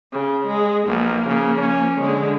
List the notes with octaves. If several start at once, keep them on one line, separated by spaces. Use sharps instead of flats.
C#3
G#3
B1 F3 A#3
C#3
C#4
D3 G#3